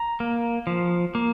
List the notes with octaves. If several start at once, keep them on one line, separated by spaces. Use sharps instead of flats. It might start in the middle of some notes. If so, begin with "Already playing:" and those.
Already playing: A#5
A#3
F3
A#3